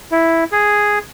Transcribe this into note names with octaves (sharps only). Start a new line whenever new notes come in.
E4
G#4